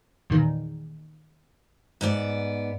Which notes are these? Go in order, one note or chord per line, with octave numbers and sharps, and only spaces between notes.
E2 A#2 D#3
G#2 B3 D5